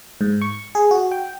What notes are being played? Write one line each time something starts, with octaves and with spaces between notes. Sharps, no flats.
G#2
C#6
G#4
F#4
G5